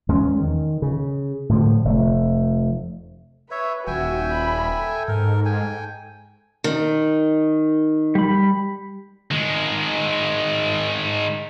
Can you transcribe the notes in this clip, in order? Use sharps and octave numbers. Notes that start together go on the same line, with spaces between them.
E2 G#3 C#4
D#3
C#3
A2 D3 F3
F1 A3
B4 C#5 E5
D#1 F#4 E5 G5 G#5
B5
A4
G#2 A#4
G5 G#5
D#3
G3 B5
D#3 G#3